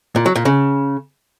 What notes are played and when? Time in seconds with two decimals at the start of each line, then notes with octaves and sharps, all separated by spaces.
0.16 A#2
0.26 F#3
0.36 A#2
0.45 C#3